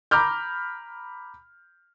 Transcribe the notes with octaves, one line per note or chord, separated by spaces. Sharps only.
A#5 B5 D6 F6 G6